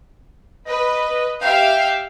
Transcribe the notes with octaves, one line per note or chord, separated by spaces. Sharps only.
B4 D#5
G4 E5 F5 G5